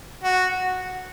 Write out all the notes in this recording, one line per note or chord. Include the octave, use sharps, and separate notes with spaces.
F#4